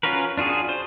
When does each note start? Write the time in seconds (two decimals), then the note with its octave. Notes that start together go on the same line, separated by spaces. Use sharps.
0.03 C#4 F4 F#4 A#4 B4
0.37 D4 F4 F#4 G#4
0.69 C5